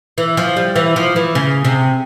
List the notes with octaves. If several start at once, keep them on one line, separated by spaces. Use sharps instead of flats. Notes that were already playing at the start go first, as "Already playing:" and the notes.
E3
F3
G3
E3
F3
E3
C#3
C3